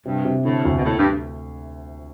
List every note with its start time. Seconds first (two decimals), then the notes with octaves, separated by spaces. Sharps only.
0.05 G2 C3
0.25 C3
0.45 A2 D3
0.65 D2
0.77 B2
0.84 A2 A3
0.97 G2